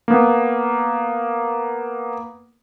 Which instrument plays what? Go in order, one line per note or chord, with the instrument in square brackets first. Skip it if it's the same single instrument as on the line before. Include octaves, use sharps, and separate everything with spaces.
[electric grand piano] A#3 B3